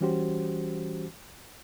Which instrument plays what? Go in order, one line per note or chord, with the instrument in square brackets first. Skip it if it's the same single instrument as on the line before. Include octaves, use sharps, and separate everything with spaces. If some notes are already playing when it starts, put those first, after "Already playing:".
[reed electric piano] E3 G3 C#4 F#4 G4 C5